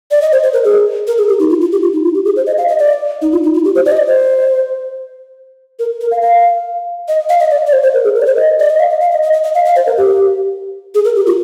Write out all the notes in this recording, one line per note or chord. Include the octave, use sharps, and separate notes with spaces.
D5
D#5
C5
C5
A#4
G#4
A#4
G#4
G4
D#4
F4
F4
G4
F4
D#4
F4
G4
G#4
C5
D#5
F5
D#5
D5
D#4
F4
D#4
F4
G4
C5
D5
D#5
D5
C5
A#4
A#4
F5
F5
D#5
F5
D#5
D5
D5
C5
C5
A#4
G#4
A#4
D5
C5
D#5
D5
D#5
F5
D#5
F5
D#5
D#5
D#5
D#5
F5
F5
C5
A#4
G4
G#4
A#4
G4
F4